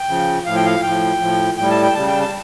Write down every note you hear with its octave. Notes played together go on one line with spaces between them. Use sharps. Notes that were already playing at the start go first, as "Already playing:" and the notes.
Already playing: G5
C#3 F3
A2 F3 F5
G5
F5
A2 F3 G5
A2 F3
A2 G3 G5
A5
G5
C#3 G3 A5
G5
A5